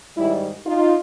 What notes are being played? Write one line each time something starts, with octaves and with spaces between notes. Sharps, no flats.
G#2 D#3 G3 E4
D#4 F4